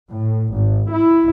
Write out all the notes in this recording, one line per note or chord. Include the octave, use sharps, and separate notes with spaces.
A2
G#1
E4